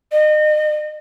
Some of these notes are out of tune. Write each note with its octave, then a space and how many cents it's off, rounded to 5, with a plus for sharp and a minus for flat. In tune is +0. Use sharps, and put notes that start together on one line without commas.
D#5 -35